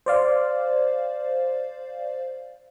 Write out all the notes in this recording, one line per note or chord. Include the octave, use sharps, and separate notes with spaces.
C5 D5 F5